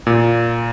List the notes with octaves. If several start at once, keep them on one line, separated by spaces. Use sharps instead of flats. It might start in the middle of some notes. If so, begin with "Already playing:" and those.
A#2